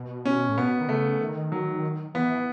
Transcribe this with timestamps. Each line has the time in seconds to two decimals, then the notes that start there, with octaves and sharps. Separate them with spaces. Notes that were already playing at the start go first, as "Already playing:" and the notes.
Already playing: B2
0.25 C#4
0.49 A2
0.58 B2 B3
0.80 D#3
0.88 C#3 A3
1.20 D#3
1.52 F#3
2.14 E3 B3